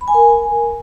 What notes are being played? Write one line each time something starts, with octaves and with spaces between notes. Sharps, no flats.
B5
G#5
A#4